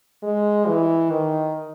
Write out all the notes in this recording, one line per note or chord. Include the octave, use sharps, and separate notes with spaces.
G#3
E3
D#3